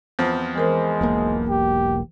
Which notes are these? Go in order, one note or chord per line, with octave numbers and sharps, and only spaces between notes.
E2 F3 C4
E3 G#3 A#4 C5
E1 B1 A#3
G4